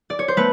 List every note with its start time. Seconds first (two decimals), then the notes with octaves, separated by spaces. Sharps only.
0.10 D5
0.19 C#5
0.28 C5
0.37 A3 B3 B4